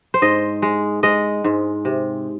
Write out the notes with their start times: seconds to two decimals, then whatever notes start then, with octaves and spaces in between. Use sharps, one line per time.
0.14 C5
0.22 G#2 D#5
0.62 G#3
1.03 G#3 D#5
1.44 G#2
1.85 C3